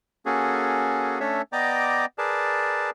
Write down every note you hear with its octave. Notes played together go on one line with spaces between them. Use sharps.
A#3 C#4 F#4 G#4 A4
A3 C#4 D4 A4 C#5 E5
B3 D5 D#5 G5 A#5 D6
G#4 A#4 B4 D5 A5